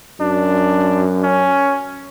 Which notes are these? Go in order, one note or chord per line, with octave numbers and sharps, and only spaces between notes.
F#2 D4
C#4